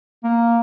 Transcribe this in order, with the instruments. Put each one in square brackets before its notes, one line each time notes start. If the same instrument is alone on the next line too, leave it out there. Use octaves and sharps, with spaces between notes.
[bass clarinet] A#3